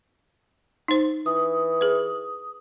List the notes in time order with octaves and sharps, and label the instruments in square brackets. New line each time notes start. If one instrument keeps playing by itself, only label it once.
[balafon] D#4 C5
[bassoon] E3 [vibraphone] D#6
[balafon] G#4 B4